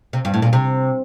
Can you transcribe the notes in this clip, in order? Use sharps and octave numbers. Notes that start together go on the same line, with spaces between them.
C3
G2
A2
A#2
C3